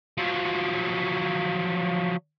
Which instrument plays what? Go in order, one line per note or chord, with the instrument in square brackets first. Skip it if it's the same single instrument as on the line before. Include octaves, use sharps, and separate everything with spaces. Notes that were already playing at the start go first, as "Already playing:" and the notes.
[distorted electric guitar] F3 F#3